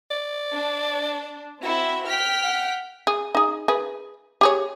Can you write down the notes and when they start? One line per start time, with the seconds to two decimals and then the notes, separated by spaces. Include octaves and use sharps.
0.11 D5
0.54 D4
1.63 C4 E4 F#4 E5
2.07 G5 F6 B6
2.44 F#5
3.07 G#4
3.35 D#4 G#4
3.68 G#4 B4
4.41 G4 G#4 C#5